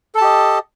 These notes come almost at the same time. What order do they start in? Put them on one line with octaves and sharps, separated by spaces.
A4 A5 G4 D#5